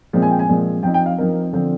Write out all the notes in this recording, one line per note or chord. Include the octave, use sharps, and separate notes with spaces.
A#2 F3 G#3 C4
G#5
G5
G#5
A#2 F3 G#3 C4
F3 C4 D#4 G5
G5
F5
F3 C4 D#4 A#4
D3 F3 C4